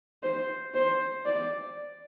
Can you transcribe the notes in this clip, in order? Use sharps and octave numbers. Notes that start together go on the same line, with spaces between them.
C5
C5
D5